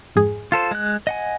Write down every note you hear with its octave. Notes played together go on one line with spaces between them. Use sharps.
F2 G#2 G#4
F4 A4 C5
G#3 F#6
D#5 F#5 G#5